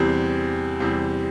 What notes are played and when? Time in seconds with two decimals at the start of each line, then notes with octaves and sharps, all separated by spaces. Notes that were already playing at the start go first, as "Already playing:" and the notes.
Already playing: E2 C3 G3 C4
0.80 E2 C3 G3 C4